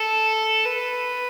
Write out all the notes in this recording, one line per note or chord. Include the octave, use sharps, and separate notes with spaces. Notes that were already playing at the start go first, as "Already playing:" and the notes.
Already playing: A4
B4